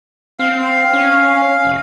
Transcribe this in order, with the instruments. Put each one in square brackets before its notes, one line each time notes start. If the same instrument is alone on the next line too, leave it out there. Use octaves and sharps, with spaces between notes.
[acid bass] C4 [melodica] F5
[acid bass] C#4
F1